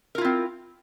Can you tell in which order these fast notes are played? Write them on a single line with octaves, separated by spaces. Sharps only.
A#4 F4 E4 C4